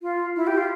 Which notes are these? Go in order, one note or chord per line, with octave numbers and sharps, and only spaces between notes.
F4
E4
G4
F4